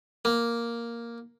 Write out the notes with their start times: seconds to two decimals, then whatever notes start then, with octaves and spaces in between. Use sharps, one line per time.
0.25 A#3